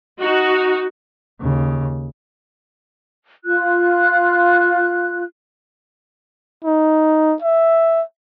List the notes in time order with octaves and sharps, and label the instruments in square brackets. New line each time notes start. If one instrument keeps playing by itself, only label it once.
[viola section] D#4 F#4
[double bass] D#2 C#3
[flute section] F4 F#6
[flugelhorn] D#4
E5